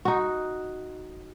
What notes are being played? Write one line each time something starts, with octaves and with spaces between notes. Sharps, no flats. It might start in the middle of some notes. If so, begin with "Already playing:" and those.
D#4 F#4